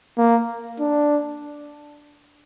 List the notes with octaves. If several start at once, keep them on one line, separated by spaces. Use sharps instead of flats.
A#3
D4